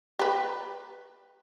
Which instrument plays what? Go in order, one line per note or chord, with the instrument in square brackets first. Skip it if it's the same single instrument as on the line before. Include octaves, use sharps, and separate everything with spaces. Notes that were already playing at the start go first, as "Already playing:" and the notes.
[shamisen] G4 B4